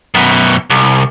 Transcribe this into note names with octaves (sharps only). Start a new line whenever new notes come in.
F#2 B2
C2